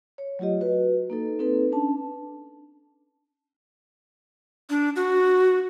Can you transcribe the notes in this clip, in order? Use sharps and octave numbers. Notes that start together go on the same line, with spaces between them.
C#5
F#3 A3 F4 G4 D#5
F#4 B4
A#3 D#4 A4
C4 D#4 A4 B4
C#4 D4 A5
D4
F#4